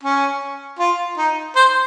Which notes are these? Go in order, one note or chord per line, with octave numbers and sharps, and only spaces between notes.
C#4
F4
D#4
C5